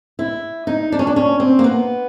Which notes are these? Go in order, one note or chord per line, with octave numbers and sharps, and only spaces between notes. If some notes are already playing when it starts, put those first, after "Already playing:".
E4
D#4
D4
C#4
D4
C#4
C4
A#3
B3